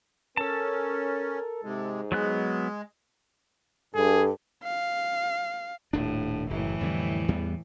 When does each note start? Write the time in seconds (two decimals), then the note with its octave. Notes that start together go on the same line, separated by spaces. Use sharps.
0.37 C#4 A4 A#4 A5
1.64 G#2 C3 G#3
2.12 F#3 G#3 B3 F#6
3.95 G2 G#4 A4
4.63 F5
5.93 D#1 A2 D4
6.50 F#1 A2 E3
6.81 F2 D3 G3
7.28 E2 G3 B3